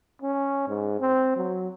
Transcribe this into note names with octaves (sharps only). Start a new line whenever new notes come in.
C#4
G#2
C4
F#3